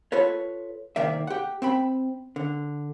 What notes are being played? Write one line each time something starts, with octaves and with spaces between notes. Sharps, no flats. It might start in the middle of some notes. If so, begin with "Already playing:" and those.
F4 A4 B4 C#5
C2 D#3 A#3 D5 E5
G4 F#5
C4 G5 B5
D3